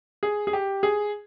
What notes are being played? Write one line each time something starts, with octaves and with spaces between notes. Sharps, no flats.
G#4
G#4
G4
G#4